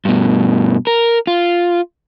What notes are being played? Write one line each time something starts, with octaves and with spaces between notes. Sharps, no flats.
G2 B2
A#4
F4